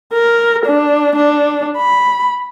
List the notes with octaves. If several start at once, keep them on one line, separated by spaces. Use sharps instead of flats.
A#4
D4
D4
B5